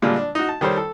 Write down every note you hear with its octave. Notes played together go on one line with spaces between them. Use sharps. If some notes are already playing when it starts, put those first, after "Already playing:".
A#2 D3 G3 G#3 F4
D4
D#4 F#4
A5
D#3 G3 A4 C5 C#5
A4